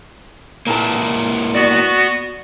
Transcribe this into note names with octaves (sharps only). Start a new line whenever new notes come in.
A#2 A#3 E4 B4 A5
B3 F#4 D5